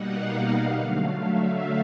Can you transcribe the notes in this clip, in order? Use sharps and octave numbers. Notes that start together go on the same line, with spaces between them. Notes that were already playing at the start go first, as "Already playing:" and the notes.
Already playing: B2 G3 A#3 D#4 F#5
F5
F#5
D3 F#3 A3 F5
E5